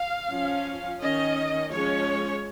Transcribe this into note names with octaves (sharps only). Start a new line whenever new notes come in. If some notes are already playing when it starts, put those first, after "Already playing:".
Already playing: F5
F3 C#4
D#3 C#4 D#5
F3 G#3 C#4 C#5